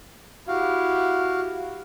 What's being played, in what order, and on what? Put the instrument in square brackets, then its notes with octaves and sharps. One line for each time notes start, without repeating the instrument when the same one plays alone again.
[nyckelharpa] E4 G4 [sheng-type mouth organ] F#4 F5